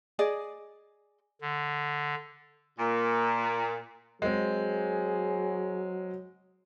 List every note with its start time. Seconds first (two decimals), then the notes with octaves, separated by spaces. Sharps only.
0.19 G#4 D5 D#5
1.41 D3
2.78 A#2
4.22 F#3 G#3 C4 G#4